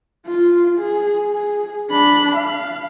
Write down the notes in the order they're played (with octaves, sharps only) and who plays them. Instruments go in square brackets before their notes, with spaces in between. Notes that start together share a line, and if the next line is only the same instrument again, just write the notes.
[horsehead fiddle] F4
G#4
G#4
D4 B5
F5